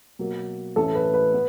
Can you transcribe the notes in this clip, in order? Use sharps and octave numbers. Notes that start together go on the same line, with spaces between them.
B2 F#3 A#3
A2 E3 A3 C#4 A4
B4
B4
B3